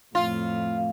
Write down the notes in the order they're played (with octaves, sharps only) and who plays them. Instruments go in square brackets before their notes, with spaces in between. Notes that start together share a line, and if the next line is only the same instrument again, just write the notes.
[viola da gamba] F2 A2 [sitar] F4